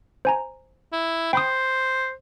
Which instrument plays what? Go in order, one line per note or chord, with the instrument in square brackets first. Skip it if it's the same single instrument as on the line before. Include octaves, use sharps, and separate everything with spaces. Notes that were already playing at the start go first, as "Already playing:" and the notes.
[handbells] C5 G#5 A#5
[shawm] E4
[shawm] C5 [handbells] G5 B5 D#6